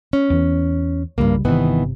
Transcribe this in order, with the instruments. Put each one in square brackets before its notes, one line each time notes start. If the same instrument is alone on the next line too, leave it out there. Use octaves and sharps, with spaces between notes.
[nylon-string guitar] C#4
[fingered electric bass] E2 E3
[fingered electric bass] C2 C#3 G3 [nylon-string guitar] G2 A#3
[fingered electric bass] G1 C3 [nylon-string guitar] D#3 E3 B3